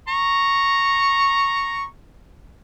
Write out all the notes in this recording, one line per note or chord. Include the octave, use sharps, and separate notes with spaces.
A#5 C#6